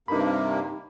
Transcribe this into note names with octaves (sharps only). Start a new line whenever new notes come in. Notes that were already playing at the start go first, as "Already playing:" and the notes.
G2 C3 A#3 D#4 B5